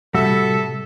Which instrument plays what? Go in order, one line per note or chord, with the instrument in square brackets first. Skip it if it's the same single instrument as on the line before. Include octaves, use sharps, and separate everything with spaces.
[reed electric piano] A2 C3 [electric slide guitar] G3 F#4 [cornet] A4 [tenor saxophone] E5